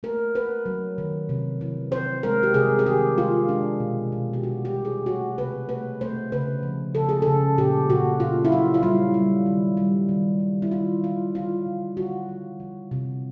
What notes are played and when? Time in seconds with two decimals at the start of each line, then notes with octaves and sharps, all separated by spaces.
0.03 A3 A#4
0.35 A3 B4
0.66 F#3
0.98 D#3
1.29 C3
1.61 E3
1.91 E3 C5
2.23 G#3 A#4
2.43 G4
2.54 C3 G#4
2.79 G#4
2.86 D#3 G4
3.18 G#3 F4
3.49 G#3 D4
3.80 B2
4.12 B2
4.33 G4
4.43 B2 F#4
4.65 G4
4.75 B2
4.85 G#4
5.06 A3 F#4
5.38 C3 B4
5.69 A3 B4
6.01 A3 C5
6.32 C#3 B4
6.63 F3
6.95 C#3 A4
7.09 G#4
7.22 C#3 A4
7.58 A#2 G4
7.89 A#2 F#4
8.20 A#2 F4
8.45 E4
8.52 F#3 F4
8.74 F4
8.83 G3 E4
9.14 G3
9.46 D#3
9.77 G3
10.09 D#3
10.40 D#3
10.62 E4
10.71 D#3 F4
11.03 D#3 F4
11.35 D3 F4
11.66 D3
11.97 D3 F#4
12.29 G3
12.60 E3
12.91 C3